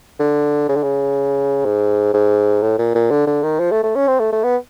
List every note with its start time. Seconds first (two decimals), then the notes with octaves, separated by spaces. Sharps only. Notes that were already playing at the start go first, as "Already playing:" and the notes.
0.20 D3
0.69 C#3
0.76 D3
0.83 C#3
1.65 G#2
2.14 G#2
2.62 A2
2.79 A#2
2.95 A#2
3.11 D3
3.27 D3
3.43 D#3
3.59 F3
3.71 A3
3.83 A3
3.95 C#4
4.07 C4
4.20 A3
4.32 A3
4.44 B3